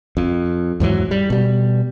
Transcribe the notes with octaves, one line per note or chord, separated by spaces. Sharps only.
F2
E2 G#2 E3 F#3
G3
B2 G3